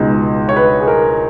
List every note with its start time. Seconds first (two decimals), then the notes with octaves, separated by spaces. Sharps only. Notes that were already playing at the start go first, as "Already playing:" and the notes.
Already playing: C#2 B2 G#3 D#4
0.49 C#5
0.56 B4
0.80 G#4
0.88 A#4